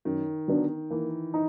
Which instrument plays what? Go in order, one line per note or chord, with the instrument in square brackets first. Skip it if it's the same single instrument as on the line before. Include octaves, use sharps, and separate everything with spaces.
[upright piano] F#2 [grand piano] D#3
[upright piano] D3 F#3 B3 D4
[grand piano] E3 [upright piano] A#3
[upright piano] D#4